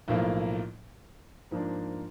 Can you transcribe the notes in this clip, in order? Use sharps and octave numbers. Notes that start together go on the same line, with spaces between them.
B1 A2 F3 A#3
G#2 F3 A#3 D4